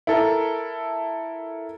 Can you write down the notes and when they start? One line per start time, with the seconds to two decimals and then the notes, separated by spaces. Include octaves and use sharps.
0.07 E4 A4 A#4